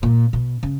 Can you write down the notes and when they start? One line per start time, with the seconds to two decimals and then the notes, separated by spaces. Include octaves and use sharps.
0.03 A#2
0.33 B2
0.63 C#3